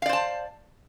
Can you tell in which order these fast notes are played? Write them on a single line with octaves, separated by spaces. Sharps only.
F5 D5 C5 A5